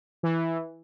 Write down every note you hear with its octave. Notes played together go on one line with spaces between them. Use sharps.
E3